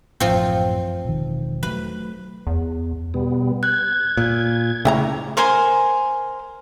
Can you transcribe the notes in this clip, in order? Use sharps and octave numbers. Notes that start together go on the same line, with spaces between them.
A1 F#2 F3 C4
E1 D#3
F#3 G#3 A3 B4
E2
B2 G3 B3
F#6 G#6
A#2
C#3 A3 E4 G5 A#5
A#4 C5 G#5 C6